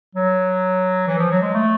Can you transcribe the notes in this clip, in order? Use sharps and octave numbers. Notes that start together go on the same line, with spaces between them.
F#3
E3
F3
F#3
G#3
A3